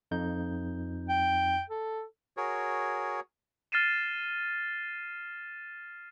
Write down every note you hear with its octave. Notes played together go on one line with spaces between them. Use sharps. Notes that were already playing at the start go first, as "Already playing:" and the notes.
F2 D#4 G6
G5
A4
F#4 G#4 A#4 C#5
F6 A6 C7 D#7 E7